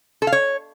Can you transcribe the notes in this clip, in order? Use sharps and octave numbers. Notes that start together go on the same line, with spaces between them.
A4
F5
C#5